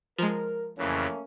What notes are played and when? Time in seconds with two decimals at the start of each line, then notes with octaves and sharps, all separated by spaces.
0.18 F3 G#3 A#4
0.78 F2 C#3 E3 A3 A#3 C#4